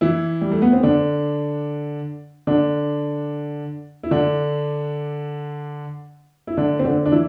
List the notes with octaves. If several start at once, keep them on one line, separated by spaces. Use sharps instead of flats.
E3 E4
G3
A3
B3
C4
D3 D4
D3 D4
E4
D3 D4
E4
D3 D4
C4
D3 D4
D4
E3 E4